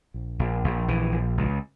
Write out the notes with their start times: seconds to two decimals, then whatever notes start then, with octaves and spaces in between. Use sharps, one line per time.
0.14 A#1
0.39 A#1
0.64 A#1
0.88 A#1 E3
1.12 A#1
1.37 C#2